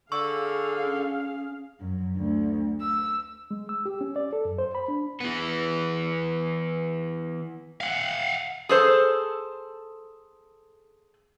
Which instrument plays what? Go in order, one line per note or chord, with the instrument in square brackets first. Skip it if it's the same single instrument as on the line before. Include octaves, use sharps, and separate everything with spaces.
[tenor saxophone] D3 [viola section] G#4 F5 [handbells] C#6 E6
[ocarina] C#4
[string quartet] F#2
D2
E6
[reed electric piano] G#3
E6
G4
C#4
D5
A4
F#2
C5
B5
D4
[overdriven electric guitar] E3 B3
[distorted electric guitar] F5 F#5
[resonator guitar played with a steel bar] G#4 A4 C5